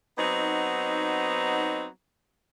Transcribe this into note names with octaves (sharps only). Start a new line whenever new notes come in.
F#3 B3 C4 D#4